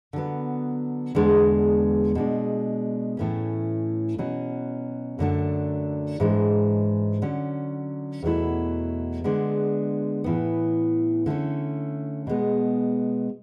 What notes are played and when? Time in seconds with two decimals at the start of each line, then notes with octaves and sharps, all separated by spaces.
0.13 D3 F#3 B3
1.15 E2 D3 G#3 B3 D4
2.15 B2 G#3 D4
3.17 A2 E3 A3 C#4
4.18 B2 F#3 C#4
5.19 F#2 D3 F#3 A3 D4
6.20 G#2 E3 G#3 D4
7.22 D3 F#3 C#4
8.22 E2 B2 F#3 A3 E4
9.24 D3 G#3 B3 D4
10.24 A2 E3 B3
11.26 D3 A3 C#4
12.27 B2 G#3 B3